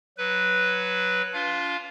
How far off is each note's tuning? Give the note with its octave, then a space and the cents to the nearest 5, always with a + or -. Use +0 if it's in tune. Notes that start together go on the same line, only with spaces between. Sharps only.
F#3 +0 B4 +0
D4 -40 F4 +0 F5 +0